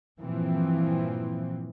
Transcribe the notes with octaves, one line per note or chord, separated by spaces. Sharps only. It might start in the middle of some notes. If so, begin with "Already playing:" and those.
G2 A#2 E3 F3 C4